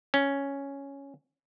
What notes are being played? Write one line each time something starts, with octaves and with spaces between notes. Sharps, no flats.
C#4